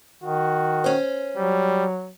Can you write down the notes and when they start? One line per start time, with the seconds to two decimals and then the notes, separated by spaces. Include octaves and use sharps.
0.23 D#3 F#4
0.84 C#4 C5
1.37 F#3 G3